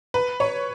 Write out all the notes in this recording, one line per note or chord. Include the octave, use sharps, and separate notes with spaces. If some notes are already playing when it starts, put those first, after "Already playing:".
B4
C#5